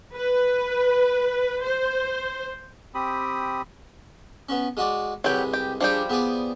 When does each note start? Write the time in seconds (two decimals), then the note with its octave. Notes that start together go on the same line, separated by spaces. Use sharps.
0.16 B4
1.64 C5
2.95 C4 G4 B5 D#6
4.49 B3 C#4
4.77 G#3 F#4 D5
5.24 C2 F#3 G#3 G4 B4
5.53 G4
5.81 F3 G3 D4 G4 G#4
6.10 B3 G#4 D5